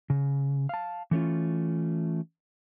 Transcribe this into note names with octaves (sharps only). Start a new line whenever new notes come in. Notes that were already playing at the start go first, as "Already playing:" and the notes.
C#3
F5 A5
E3 A3 C#4 F4